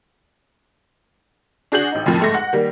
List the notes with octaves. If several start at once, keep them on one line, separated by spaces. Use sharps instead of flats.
D4 F#4 G#4 G6 F#7
A1 D#4
F2 A2 D#3 F3
G#2 A3 A#6
F#5
D#3 G3 A#3